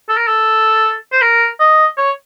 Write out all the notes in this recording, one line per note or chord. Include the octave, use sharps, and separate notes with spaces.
A4
A#4
A4
C5
A#4
D#5
C#5